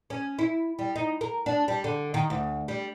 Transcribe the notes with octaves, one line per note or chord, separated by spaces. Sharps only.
C#4
E4
G3
D#4
A#4
D4
G3
D3
D#3
D2
G3